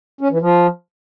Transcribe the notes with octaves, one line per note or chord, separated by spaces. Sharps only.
C#4
E3
F3